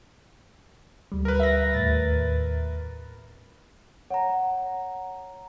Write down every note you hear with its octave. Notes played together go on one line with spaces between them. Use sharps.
D2 G3
A#4 B4
E5 A#6
D#2 A2 A6
C#5 F#5 A#5